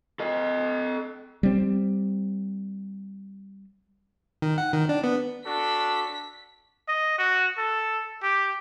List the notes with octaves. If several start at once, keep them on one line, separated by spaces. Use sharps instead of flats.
A4 D#5
G3 C4
D#3
F#5
D#3
D4
B3
D4 F#4 A4 B6
D#5
F#4
A4
G4